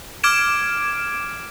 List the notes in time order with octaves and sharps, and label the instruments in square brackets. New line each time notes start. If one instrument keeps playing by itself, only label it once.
[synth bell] D6 F6 G#6 D7 E7